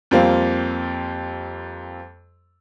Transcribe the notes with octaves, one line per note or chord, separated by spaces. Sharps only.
F2 G3 A#3 C4